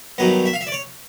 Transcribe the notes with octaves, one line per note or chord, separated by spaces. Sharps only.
G2 D#3 F#3 B3 D#5
E5
F5
E5
D5
C#5